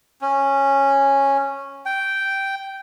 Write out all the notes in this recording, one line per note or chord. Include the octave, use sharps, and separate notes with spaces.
C#4
G5